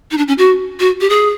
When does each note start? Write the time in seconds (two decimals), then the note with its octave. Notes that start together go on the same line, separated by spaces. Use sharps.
0.11 D#4
0.18 D4
0.28 C#4
0.38 F#4
0.80 F#4
1.01 G4
1.10 G#4